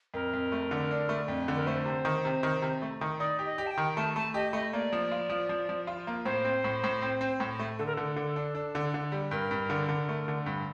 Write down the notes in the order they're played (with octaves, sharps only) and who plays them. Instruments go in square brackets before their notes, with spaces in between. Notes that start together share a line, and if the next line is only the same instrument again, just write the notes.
[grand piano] F2 [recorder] A#4
[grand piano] F2
A3
D3
D4
A3
F2
D3
[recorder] A#4
[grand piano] A3 [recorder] C5
[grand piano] C3
D#3
C3
D#3
C3
A3
D#3
[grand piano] D#4 [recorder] D5
[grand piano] G4
[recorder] D#5
[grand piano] G4
[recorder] A5
G5
[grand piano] D#3
[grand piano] A3 [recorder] A5
[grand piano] A3 [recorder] A5
[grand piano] G4 [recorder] D#5
[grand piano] A3 [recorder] D#5
[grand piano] A#3 [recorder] D5
[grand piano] F3
F4
F3
F3
F3
F4
A#3
[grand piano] A2 [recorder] C5
[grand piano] C4
A2
A2
C4
C4
A2
A3
[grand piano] D3 [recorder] A4
[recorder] A#4
[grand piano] D3 [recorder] A4
[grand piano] D3
D4
D4
D3
D3
G3
[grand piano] G2 [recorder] A#4
[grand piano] G2
D3
D3
A3
D3
G2